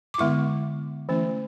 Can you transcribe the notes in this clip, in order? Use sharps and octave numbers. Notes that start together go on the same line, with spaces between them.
D6
D3 G#3 B3 E4 C#6
E3 A3 C#4 E4